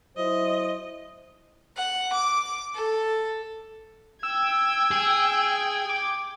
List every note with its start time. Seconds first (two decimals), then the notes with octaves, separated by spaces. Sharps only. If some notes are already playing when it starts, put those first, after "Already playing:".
0.17 F#3 E4 C5 D#5
1.76 F#5
2.13 D6
2.75 A4
4.23 G5 E6 G#6
4.91 G#4
5.89 D6